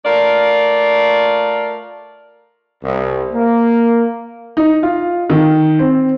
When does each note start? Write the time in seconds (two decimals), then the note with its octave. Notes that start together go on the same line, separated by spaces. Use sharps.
0.05 A3 F4 A#4 D5
2.84 C2
3.32 A#3
4.57 D#4
4.83 F4
5.30 D#3
5.79 C4